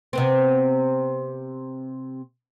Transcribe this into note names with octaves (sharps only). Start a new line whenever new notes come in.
C3 B3 C4